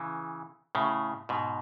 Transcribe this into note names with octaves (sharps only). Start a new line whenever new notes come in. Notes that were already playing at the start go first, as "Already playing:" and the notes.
Already playing: C#3 E3
A2 C#3
G#2 B2